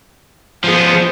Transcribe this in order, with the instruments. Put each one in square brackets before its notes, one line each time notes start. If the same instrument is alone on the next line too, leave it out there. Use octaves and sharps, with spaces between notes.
[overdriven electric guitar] F3 B3 [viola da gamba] G#4 C5